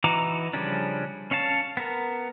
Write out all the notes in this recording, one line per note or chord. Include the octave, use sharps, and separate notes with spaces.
E3 D#4 F#4 A#5 D6
C#3 F3 G3 C#4 D4
C#4 C#5 F5 A5
B3 A#4